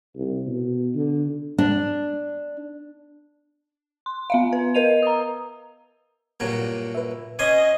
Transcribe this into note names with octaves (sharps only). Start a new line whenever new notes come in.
C2
B2
D3
D4
C6
B3 E5 F5
B4
A#4 B4 D#5 D#7 F7
A#5 D#6
G2 A#2 F#3
B4 E5
C#4 D#5 G#5 C6